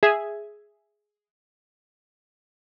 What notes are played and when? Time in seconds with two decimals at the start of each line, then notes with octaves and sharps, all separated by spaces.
0.03 G#4 E5 G#5 G#6